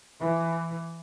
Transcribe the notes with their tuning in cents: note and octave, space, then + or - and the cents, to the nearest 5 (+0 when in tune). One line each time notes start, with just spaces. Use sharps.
E3 +15